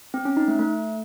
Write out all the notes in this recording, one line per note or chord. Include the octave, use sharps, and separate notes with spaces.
C4
C#4
D#4
A3
A3